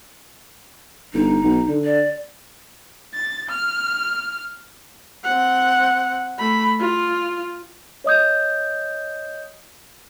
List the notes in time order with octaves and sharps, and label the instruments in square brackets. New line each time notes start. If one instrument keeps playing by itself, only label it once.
[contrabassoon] G1 [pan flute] D#4
[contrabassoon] B1
D3
[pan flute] D5
[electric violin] A6
F6
[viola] C4 F#5
A3 B5
F4
[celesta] C#5 D#5 D#6 G6